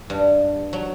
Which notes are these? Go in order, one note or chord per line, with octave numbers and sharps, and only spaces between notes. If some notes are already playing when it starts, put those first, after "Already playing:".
G2
F#3